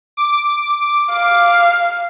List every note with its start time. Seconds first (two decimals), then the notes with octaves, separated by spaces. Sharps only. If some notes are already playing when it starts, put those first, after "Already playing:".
0.17 D6
1.13 F5